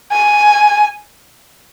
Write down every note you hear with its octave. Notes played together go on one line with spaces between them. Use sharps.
G#5